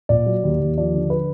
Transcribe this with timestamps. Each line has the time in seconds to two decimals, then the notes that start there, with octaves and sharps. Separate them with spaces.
0.09 A#2 D5
0.26 F#3
0.43 D#2
0.60 D#2
0.78 F3 D5
0.94 D3
1.10 B4